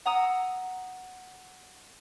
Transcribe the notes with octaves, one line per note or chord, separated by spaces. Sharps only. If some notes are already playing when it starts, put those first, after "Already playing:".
F#5 A#5 D#6 E6